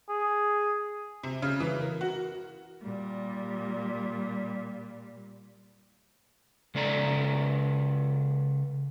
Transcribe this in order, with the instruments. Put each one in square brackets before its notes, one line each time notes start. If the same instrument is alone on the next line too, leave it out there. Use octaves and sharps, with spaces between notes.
[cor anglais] G#4
[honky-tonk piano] C3
C#3
E3
A#4
F#4
[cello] A#2 G3
[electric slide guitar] C#3 G#3 A4 D5 A#5